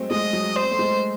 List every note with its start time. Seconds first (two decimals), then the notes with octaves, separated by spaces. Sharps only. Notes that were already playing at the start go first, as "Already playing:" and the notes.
Already playing: F#3 G#3 A3 C4
0.11 G#3 D#5
0.33 F#3
0.56 C5
0.62 C4
0.71 A3
0.79 G#3